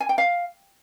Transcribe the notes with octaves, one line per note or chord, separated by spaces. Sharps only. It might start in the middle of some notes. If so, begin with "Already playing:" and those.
G#5
G5
F5